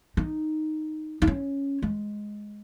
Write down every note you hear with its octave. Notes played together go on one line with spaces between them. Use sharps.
D#4
D#4
C#4
G#3